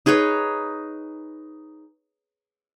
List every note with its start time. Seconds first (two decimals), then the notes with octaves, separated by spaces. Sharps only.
0.06 D#4 G#4 B4 C#5